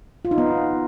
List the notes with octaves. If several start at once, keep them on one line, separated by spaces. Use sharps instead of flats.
F4
D#4
B3